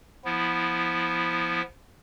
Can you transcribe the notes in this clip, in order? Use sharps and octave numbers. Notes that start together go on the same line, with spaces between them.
F3 B3 E4